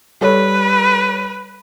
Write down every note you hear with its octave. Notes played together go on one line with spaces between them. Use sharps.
G3 A4 B4 C#5